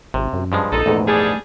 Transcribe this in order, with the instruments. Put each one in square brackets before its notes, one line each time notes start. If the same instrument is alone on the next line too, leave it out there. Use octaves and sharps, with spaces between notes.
[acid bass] G#1 [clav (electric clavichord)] C3
[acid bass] F#2
[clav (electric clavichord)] G2 F3 G#3
[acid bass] A#1 [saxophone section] D#4 A4
[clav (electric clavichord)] A#1 E2 G#2 [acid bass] A3
[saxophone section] G3 D4 G#4